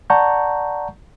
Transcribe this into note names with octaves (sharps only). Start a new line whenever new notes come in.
D5 F#5 A5 A#5 C#6 G6